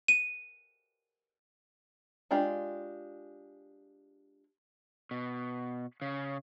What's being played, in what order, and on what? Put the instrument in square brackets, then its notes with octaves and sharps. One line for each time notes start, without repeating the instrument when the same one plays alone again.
[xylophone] D#7
[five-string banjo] G#3 D4 F4 G4
[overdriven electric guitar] B2
C#3